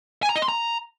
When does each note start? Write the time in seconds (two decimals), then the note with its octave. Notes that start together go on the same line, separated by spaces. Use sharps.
0.23 G#5
0.29 A#5
0.36 D#5
0.42 C6
0.49 A#5